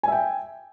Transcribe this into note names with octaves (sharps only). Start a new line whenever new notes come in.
E5 G5 G#5